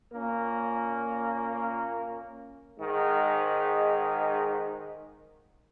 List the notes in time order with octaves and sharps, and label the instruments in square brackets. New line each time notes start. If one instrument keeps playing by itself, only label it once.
[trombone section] A#2 A#3 C#4 A#4
G#2 D#3 G#3